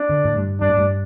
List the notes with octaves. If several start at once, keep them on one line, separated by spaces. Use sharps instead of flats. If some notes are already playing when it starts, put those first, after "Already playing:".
Already playing: D4
D3
A2
G2
G2 D4
A2
G2